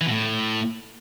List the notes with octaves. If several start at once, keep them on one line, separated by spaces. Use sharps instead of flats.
E3
B2
A2